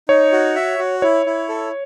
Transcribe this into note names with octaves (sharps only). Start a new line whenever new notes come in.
D#4 C#5
F#4
E5
F#4
E4 C#5
E4
A4